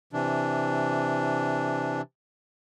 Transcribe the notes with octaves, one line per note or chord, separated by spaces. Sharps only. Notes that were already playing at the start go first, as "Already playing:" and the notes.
C3 E3 D4